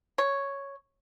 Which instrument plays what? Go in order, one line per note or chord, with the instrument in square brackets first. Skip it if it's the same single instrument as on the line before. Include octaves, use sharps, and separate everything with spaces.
[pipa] C#5